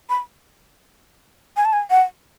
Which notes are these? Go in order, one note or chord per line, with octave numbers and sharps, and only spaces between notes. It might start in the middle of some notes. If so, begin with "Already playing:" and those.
B5
G#5
A5
G#5
F#5